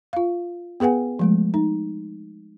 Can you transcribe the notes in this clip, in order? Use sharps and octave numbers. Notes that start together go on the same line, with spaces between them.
F4 F5
B3 G#4 B4 F#5 G#5
F3 G#3 A3
D#4